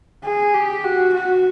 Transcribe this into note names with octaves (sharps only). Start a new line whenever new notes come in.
G#4
G4
F#4
F#4